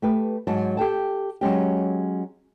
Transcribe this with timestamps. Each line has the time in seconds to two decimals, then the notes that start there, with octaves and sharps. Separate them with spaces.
0.02 A3 G4 B4
0.47 G#2 F#3 A5
0.77 G4 A4 G5 A5
1.41 F#3 G#3 C#4 G4